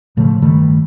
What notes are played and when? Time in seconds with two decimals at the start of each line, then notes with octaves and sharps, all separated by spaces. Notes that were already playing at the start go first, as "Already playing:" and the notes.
0.17 A2 C#3 F3 A3
0.42 G2 D#3 G3 A3